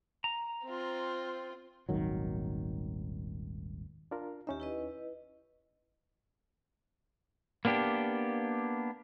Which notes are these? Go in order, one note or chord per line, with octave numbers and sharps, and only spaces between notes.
A#5
C4 F4
D#1 G#1 D#3 F#3
D4 F4 A#4
D#2 C#4 D#4 G4 E5
E4 B4 D#5
A#3 B3 D4 G4